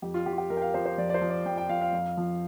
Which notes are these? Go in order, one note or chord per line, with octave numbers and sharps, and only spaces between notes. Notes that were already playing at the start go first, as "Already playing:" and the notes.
F2 G4
F4
F3 G4
F4
G4
F2 A#4
G5
F5
F3 C5
C5
F2 D5
D5
C5
F3
D5
F2 G5
G5
F3 F5
F5
F2
F3